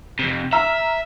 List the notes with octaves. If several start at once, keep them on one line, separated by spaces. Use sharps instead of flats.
F2 C3
E5 A#5 E6 F6